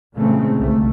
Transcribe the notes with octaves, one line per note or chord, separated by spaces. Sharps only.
A#2 C#3 E3 G#3 A3 C4
G1 C2 C#3 A3